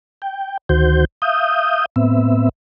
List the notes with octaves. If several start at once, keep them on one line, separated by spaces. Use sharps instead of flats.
G5
D2 D#3 F#4 C5 G6
E5 F5 D#6 G6
A2 B3 C4 E5